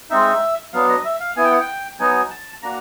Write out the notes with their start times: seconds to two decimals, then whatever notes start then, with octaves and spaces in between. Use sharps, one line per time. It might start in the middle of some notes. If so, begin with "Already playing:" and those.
0.10 G#3 C4 D#4 E5
0.73 F#3 B3 D4 F5
0.89 D#5
1.05 E5
1.20 F5
1.36 B3 E4 G#5
1.44 G5
1.51 F#5
1.60 G5
1.99 F#3 B3 D#4 F#4 G#5
2.30 A5
2.62 A#3 D4 F#4 A#5